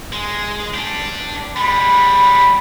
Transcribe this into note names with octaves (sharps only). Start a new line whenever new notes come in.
G#3
D4 G4
G3 G#3 B5